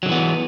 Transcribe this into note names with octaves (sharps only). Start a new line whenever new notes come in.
D3 E3 F#3 B3